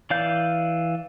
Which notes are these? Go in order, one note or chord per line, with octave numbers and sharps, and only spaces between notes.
E3 D5 F5 G6